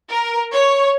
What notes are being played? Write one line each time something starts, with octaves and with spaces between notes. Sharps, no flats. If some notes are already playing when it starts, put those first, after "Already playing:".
A#4
C#5